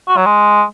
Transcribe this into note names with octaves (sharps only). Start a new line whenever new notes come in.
F#4
F#3
G#3